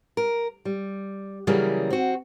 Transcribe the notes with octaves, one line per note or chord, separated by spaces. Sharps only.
A#4
G3
C#3 E3 F#3 G3 A#3 G#4
C4 F#4